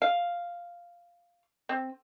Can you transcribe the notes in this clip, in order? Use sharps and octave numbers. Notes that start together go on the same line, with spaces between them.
F5
C4